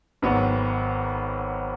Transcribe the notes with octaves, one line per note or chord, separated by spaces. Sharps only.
G#1 G#2 F#3 B3